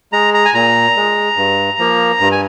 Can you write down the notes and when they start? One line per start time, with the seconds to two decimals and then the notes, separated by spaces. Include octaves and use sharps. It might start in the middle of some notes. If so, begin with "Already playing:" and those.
0.13 G#3 A#5
0.34 A#5
0.45 G#5
0.54 A#2 A#5
0.96 G#3
1.37 G2
1.79 F3 A#3
2.20 G2
2.32 G#5